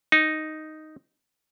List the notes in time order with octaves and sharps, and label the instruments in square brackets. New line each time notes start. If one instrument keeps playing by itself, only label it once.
[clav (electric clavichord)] D#4